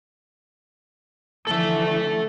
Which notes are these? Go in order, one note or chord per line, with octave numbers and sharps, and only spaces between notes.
D3 E3 F3 A4 E5